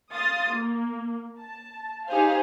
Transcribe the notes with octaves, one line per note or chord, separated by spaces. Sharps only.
F5 C6 D#6 A6
A#3
A5
D#4 G4 G#4 C5 F5